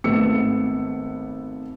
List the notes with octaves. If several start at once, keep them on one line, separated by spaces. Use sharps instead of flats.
G#1 A3 B3 E6 C#7